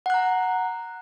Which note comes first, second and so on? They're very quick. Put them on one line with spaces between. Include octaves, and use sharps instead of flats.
F#5 F#6 A#5